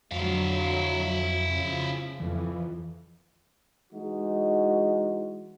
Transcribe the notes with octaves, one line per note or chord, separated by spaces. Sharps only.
F2 D3 F#3 E4 F5
C#3 F3
F2 E3 F3
E3 G#3 D#4 F#4